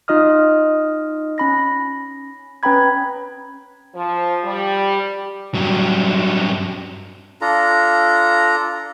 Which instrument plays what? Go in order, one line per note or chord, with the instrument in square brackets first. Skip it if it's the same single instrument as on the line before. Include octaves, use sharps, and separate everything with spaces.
[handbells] D#4 F4 D#5 D#6 F6
C#4 B5 A#6
C#4 B4 G5 A#5 B5 G#6
[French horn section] F3
G3
[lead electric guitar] G2 F#3
[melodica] D4 F4 A4 A#5